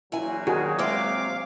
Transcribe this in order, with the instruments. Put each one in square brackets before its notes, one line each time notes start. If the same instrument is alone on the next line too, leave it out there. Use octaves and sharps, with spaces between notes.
[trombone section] A#1 A#2 F#3 [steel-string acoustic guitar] E3 G#5
[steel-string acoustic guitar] D#3 [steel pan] F#4 G#4
[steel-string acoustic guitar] C3 G#3 C4 [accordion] F5 D6